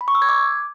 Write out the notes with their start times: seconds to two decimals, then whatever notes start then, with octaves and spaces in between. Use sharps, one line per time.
0.01 B5
0.08 C#6
0.15 E6
0.22 G#6
0.29 D6